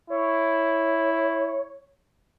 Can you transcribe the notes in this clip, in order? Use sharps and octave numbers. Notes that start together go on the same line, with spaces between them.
E4 C#5